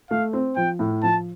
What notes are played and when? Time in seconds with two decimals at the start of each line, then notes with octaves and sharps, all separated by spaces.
0.11 A3 F5
0.33 C4
0.56 F3 G5
0.79 A2
1.03 F3 A5